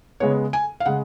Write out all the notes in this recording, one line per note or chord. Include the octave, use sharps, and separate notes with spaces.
C#3 G#3 B3 C#5
G#5
F5
C#3 G#3 F#5